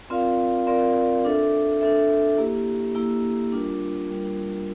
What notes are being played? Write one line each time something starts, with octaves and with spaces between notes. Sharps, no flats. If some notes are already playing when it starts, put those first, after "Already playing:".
C4 F4 A#4 D5 F5
C4 F4 A#4 D5 F5
D4 A4 E5
D4 A4 E5
A#3 E4 G4
A#3 E4 G4
G3 D4 F4 A#4
G3 D4 F4 A#4